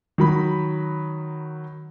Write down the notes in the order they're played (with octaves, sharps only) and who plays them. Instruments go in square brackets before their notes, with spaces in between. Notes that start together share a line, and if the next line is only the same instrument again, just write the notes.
[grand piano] D#3 F#3 B5